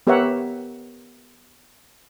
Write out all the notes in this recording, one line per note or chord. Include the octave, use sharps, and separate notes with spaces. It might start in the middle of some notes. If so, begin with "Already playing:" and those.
B3 G4 A#4 C#5 E5 F#5